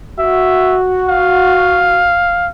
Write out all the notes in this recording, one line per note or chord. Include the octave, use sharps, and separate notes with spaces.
F#4 E5
F5